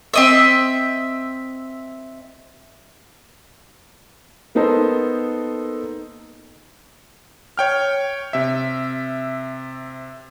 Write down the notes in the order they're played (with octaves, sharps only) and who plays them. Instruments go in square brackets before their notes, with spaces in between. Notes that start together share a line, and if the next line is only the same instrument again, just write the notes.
[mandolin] C4 D#5 E5
[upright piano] A#3 B3 D#4 A4 C5
[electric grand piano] C#5 G5 F6
C3 E5